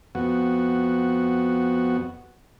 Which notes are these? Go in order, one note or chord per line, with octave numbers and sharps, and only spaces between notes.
F2 B3 F#4